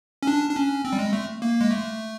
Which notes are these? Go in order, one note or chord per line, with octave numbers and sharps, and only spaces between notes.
C#4
D4
D4
C#4
C4
G3
G#3
A3
A#3
G#3
A3